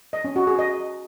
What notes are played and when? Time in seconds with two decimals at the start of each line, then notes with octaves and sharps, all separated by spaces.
0.13 D#5
0.24 C#4
0.36 F#4
0.47 G#4
0.59 D#5